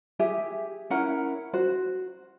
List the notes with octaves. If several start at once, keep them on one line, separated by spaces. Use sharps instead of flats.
G4 G#4 E5
C#4 E4 A#4 F#5
F#4 C5